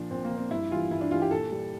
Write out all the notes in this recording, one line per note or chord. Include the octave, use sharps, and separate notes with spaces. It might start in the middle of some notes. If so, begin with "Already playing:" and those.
Already playing: A#2 F3 D4
A#2 C4
A#3
F3
C4
G2 E4
E3 G3 F4
G2 E4
D4
E3 G3 F4
G4
A#2 A4
G3